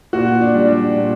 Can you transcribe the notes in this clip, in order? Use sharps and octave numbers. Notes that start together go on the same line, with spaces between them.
A#2 F#4
D4
G3
D4
A#2